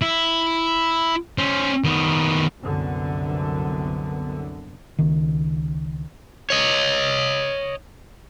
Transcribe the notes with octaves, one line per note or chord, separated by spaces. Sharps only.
E4
C#4 C5
D#3 B3
C2 F#2 D3 B3
C#2 D#3
C#5 D#5